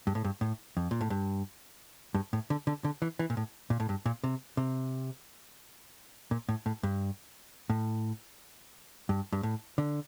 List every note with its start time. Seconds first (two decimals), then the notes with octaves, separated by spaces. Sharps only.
0.07 G2
0.15 A2
0.24 G2
0.41 A2
0.77 F2
0.91 A#2
1.01 A2
1.10 G2
2.14 G2
2.33 A2
2.50 D3
2.67 D3
2.85 D3
3.02 E3
3.19 E3
3.30 A#2
3.37 A2
3.70 A#2
3.80 A2
3.89 G2
4.06 A#2
4.24 C3
4.57 C3
6.31 A#2
6.49 A2
6.66 A2
6.83 G2
7.70 A2
9.09 G2
9.32 G2
9.43 A2
9.78 D3